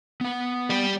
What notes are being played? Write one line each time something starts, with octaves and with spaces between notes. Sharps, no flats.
B3 F#5
G3 G4